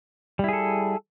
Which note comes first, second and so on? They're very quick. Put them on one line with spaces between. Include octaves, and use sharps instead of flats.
G3 E4 G#4 A4